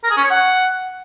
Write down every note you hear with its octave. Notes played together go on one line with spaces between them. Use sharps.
A#4
G#4
C#4
C#5
F#5